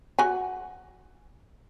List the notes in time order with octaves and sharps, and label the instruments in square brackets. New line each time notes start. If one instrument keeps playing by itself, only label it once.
[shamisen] F#4 F#5 G#5